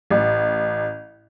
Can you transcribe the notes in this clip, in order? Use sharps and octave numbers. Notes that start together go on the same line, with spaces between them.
A1